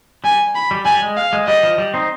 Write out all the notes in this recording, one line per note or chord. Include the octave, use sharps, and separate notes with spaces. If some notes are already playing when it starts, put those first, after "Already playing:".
G3 G#5
B5
G3
G3 G#5
G#3
F5
G#3
G3 D#5
F3
G3
C4 D#4